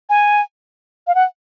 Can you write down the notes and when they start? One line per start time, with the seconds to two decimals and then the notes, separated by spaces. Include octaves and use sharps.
0.10 G#5
1.07 F5
1.15 F#5